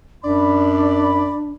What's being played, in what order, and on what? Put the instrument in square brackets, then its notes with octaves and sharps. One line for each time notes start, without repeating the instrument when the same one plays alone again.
[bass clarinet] F#2 [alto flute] D4 [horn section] D5 B5